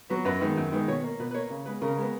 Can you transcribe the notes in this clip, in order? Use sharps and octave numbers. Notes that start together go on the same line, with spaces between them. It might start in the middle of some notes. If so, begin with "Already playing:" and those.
F#3 B3
F#2 B4
D#3 G#3 B3
F#2
D#3 G#3 B3
B2 C#5
A#3
B2 B4
B4
A#3 C#5
C#3
G#3 B3 B4
C#3 A#4
G#3 B3